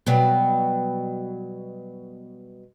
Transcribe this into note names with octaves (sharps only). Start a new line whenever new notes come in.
B2 F#3 G3